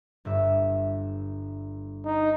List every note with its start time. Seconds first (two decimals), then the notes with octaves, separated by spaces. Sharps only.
0.25 G1 G2 E5
2.05 D#4